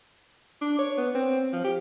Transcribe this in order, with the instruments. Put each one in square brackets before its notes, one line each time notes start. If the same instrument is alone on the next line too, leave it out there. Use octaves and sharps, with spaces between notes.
[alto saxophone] D4
C#5
B3
C4
F3
G4